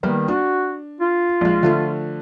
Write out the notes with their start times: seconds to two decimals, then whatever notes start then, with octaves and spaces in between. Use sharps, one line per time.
0.03 D#3 G3 A#3 B3
0.28 D4 F#4
1.01 F4
1.41 A#1 G#3
1.63 D3 F3 A3